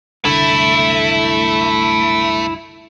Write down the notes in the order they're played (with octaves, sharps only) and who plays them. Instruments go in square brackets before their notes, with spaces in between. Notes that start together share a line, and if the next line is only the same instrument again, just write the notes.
[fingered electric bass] F#1 C2 D3 [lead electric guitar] A3 [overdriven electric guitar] E4